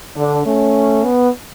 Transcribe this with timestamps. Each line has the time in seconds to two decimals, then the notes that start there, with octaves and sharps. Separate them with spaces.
0.16 D3 D4
0.45 A3 C#4
1.04 B3